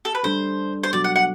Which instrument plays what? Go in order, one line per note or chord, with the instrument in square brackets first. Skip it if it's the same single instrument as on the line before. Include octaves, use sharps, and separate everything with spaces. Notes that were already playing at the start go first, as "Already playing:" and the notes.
[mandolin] A4
B4
[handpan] G3 D4 A4 [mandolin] C5
[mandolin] C5
[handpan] B2 F#3 B3 F#4 [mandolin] D5
[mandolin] F#5
F#5